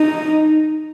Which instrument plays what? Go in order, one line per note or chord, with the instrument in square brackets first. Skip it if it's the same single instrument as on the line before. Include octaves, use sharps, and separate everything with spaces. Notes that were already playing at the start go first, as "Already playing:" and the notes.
Already playing: [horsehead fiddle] D#4